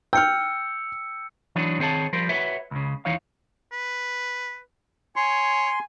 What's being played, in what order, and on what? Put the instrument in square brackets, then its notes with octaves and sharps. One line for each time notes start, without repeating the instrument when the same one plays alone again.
[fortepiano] G5 [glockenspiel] E6 C#7 [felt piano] F6 G6
[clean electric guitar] E3 F#3 D4 D#4 C#5
D#3 C4 G#4 C#5 A5
F3 G3 A#4 C5
F#4 B4 C#5 E5
C#2 C#3
D#2 E3 D#4 C#5 F5
[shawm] B4
[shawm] C#5 [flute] G#5 [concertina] C6